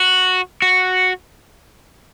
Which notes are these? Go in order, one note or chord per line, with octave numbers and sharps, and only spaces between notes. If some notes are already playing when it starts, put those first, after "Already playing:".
Already playing: F#4
F#4